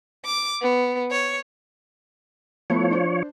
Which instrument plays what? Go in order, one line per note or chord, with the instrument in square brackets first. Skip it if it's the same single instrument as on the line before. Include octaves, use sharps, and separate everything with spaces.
[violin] D6
B3
C#5
[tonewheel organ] F3 C#5 [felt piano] A3 B3 E4
[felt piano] D4 C5